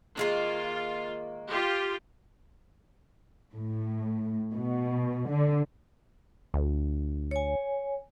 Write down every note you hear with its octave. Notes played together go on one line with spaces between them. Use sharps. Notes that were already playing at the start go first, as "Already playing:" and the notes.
D#3 G#3 A#3 F4
F4 G4
A2
B2
D3
D2
C#5 G#5